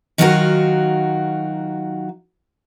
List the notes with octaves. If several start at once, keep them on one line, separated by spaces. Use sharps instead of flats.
D#3 F#3 D#4 F4 F#4 A#4